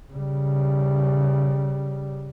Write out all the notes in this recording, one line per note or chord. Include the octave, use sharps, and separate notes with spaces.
C#3 G3